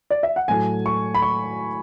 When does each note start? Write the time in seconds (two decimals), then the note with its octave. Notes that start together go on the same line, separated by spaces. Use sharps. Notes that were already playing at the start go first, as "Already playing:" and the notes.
0.10 D5
0.23 E5
0.36 F#5
0.48 A2 F#3 A3 G#5
0.86 C#6
1.14 B5
1.22 C#6